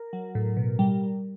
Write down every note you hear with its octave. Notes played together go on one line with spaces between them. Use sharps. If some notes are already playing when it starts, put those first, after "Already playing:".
Already playing: A#4
F#3
A2
B2
G3